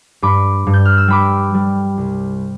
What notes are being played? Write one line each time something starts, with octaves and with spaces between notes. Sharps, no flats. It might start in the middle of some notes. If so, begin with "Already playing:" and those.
G2 B5 D6
G2
G6
F6
E6
G3 B5 D6
G3
C2